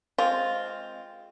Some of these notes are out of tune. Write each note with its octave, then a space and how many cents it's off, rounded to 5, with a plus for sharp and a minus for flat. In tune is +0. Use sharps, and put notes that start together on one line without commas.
G#3 +10 C4 +0 F4 +0